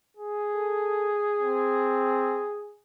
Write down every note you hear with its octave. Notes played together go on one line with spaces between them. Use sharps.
G#4
A4
C4